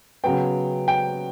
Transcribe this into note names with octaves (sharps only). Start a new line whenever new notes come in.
C#3 F#3 B3 G5
G5